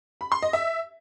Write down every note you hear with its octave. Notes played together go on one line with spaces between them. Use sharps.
B5
C6
D#5
E5